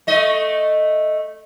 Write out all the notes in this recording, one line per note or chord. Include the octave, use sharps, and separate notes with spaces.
A3 D#5